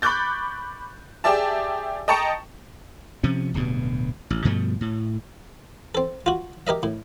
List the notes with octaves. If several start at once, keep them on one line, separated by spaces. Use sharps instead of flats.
B5 C#6 D6 F#6 G6 A6
G4 G#4 D5 E5 A5
D#5 G5 A5 A#5 C#6 C#7
C3 F3 C#4
D1 G2 B2
A1
G2 B2 F3 A3
A2
C4 A4
F4 F#4
G4 A#4 D#5 E5
A2